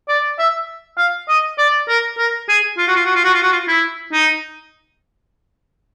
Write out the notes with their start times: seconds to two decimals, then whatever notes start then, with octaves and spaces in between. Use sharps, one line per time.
0.09 D5
0.39 E5
0.98 F5
1.29 D#5
1.58 D5
1.88 A#4
2.18 A#4
2.48 G#4
2.77 F4
2.88 F#4
2.96 F4
3.05 F#4
3.15 F4
3.24 F#4
3.34 F4
3.43 F#4
3.52 F4
3.68 E4
4.12 D#4